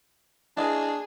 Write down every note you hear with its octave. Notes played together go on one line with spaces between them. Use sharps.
D4 E4 G#4 B4 D#5